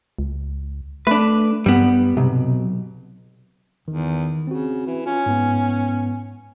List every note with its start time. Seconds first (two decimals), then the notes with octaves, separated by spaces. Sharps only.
0.19 C#2
1.07 A3 D4 B4
1.66 G2 G3 B3
2.17 B1 C3
3.88 E2 D#3
4.47 C#3 C4 F#4
4.86 E3
5.06 C#4 F4
5.26 G#2 B3